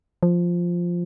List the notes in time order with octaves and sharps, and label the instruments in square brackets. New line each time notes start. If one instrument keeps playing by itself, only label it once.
[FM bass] F3